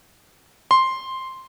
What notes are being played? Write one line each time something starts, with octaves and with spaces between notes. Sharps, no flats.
C6